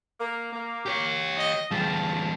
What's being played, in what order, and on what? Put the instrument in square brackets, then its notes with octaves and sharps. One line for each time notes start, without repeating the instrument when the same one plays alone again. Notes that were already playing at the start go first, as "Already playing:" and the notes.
[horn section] A#3
A#3
[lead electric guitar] G4 C#5
[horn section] D#5
[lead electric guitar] E2 G3 [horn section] F4 G#4 A5